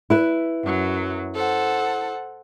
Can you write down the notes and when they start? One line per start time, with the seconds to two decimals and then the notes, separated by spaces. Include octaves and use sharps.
0.10 E4 B4
0.64 F#2 F#3
1.36 A4 C5 F#5